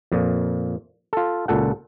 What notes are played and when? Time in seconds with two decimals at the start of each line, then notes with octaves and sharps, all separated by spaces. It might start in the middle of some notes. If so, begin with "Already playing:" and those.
0.12 F2 A#2
1.13 F4 A4
1.48 C#2 A#2 A4 F#5